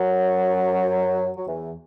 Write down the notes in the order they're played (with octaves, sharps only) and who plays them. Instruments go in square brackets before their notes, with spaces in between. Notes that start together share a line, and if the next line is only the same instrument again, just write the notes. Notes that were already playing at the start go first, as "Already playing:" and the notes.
Already playing: [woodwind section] F#2 F#3
F#3
E2 E3